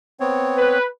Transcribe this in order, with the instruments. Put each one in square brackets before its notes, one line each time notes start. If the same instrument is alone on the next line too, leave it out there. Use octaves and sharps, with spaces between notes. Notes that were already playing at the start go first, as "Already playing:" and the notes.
[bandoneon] B3 C4 C#5
[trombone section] B4